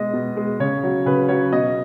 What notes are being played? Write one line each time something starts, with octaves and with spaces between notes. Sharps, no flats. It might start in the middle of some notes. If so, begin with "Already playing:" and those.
Already playing: B2 G#3 D#5
B2
G#3
C#3 C#5
F#3
C#3 B4
F#3 C#5
B2 D#5